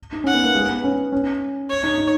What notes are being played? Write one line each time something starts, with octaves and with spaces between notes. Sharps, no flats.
D#4
C#4 F#5
B3
A#3
G#3
B3
C#4
C#4
C#5
D#4
D#4